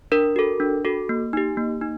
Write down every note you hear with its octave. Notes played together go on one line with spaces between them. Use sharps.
D4 A#4
F#4 A4
D4
F#4 A4
A#3
D#4 G4
A#3
D#4